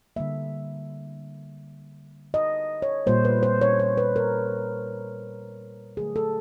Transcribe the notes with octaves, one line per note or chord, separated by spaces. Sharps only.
D3 G3 A#3 E5
D#5
C#5
A#2 G3 A#3 C5
B4
C5
C#5
C5
B4
A#4
D3 F#3 A3 G#4
A4